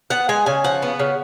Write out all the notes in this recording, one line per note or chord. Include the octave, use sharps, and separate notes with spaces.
B3 F#5
G#3 G#5
C#3 G#5
F3 F#5
B3
C#3